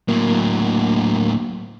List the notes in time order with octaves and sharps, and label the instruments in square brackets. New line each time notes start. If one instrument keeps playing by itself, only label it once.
[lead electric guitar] A2 F#3 [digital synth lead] A#3